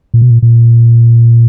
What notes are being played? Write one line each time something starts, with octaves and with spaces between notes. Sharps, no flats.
A#2
B2
A#2
A#2